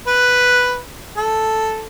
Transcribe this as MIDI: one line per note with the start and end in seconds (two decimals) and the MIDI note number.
0.07 0.81 71
1.17 1.84 69